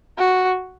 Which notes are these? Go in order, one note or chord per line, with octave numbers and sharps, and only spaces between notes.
F#4